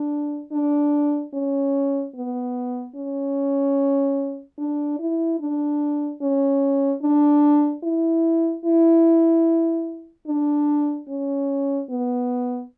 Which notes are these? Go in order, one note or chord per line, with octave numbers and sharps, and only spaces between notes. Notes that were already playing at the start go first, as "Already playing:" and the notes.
Already playing: D4
D4
C#4
B3
C#4
D4
E4
D4
C#4
D4
E4
E4
D4
C#4
B3